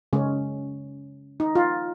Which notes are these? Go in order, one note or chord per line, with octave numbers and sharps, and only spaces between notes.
C#3 G#3 C#4
D#4
F4